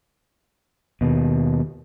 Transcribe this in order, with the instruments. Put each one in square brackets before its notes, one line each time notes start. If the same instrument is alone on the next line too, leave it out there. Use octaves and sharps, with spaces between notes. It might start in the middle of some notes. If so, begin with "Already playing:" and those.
[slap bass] D#2 B2